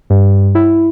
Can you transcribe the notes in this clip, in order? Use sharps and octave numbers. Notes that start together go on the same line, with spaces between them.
G2
E4